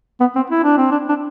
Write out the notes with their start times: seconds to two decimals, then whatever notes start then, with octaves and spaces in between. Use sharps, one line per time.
0.20 B3
0.36 C4
0.50 E4
0.64 D4
0.77 C4
0.91 D4
1.09 D4